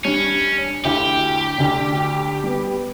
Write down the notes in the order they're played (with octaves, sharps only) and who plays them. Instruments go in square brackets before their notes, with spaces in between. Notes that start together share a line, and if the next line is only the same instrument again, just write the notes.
[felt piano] G3 D4 [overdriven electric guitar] C#4
[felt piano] D2 E4 F5 [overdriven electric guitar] G4
[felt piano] D2 D3
G3 B3